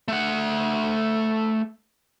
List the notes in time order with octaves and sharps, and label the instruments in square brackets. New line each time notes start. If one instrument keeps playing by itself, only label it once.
[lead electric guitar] A3 F#5